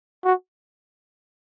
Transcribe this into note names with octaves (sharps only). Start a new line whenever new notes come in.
F#4